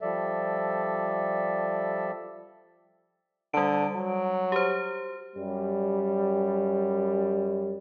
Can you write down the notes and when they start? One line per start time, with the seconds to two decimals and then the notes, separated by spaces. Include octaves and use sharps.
0.01 F3 G3 A4 D5 E5
3.54 D3 G3 D7
3.96 F#3
4.52 G4 C5
5.36 F#2 G3